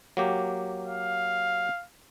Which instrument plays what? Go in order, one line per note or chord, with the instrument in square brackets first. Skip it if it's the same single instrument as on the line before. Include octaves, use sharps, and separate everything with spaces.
[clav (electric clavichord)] F#3 A#3 G4
[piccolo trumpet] F5